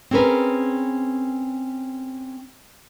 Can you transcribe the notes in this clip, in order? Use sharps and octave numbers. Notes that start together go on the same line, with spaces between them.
C4 C#4 G#4 A#4 B4